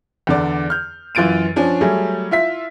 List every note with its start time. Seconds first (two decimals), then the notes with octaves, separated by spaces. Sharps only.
0.27 E2 D3 D5
0.70 F6 G6
1.15 F#2 E3 F4 A6 D7 D#7
1.56 F3 C#4 D4
1.81 F#3 G3 A3 G#4
2.31 E4 F4 E5 B6